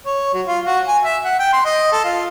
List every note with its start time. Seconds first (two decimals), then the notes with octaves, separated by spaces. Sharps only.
0.06 C#5
0.34 F#3
0.47 F4
0.66 F#4
0.87 G#5
1.04 E5
1.25 F#5
1.39 G5
1.53 C6
1.65 D#5
1.92 A4
2.04 F4